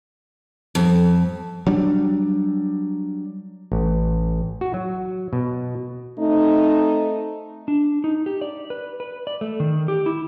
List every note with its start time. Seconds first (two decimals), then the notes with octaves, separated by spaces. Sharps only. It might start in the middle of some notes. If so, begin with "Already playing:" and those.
0.75 F2
1.67 F#3 G3 D4
3.72 A1
4.61 F#4
4.74 F#3
5.33 B2
6.19 A3 C4 D#4
7.68 D4
8.04 D#4
8.26 G4
8.41 D5
8.70 B4
9.00 B4
9.27 D5
9.41 A3
9.60 D#3
9.88 G4
10.06 E4